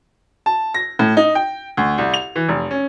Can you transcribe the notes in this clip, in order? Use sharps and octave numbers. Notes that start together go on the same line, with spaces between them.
A5
A#6
A2
D#4
G5
D2
C2
F7
E3
F1
C#4